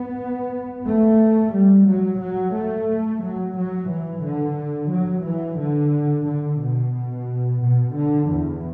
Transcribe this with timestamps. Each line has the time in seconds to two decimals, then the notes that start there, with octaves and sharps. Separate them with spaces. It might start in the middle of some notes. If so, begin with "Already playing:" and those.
Already playing: B3
0.85 A3
1.53 G3
1.87 F#3
2.21 F#3
2.55 A3
3.23 F#3
3.56 F#3
3.90 E3
4.24 D3
4.91 F#3
5.25 E3
5.59 D3
6.26 D3
6.60 B2
7.61 B2
7.95 D3
8.29 E2